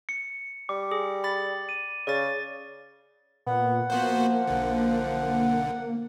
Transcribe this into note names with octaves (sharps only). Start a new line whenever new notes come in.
C#7
G3 D6
G#4
B5 A6
D#7
C#3 D5 A6
A#2 B3 F#5
F3 A#3 B3 F#4 C5
B1 D3
F#5